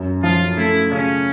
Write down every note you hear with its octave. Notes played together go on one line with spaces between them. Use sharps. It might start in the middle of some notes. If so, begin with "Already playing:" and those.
Already playing: F#2
F3 F4
A3 E4
C#3 C#4